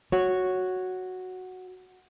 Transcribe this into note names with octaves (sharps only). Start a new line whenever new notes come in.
F#4 C#5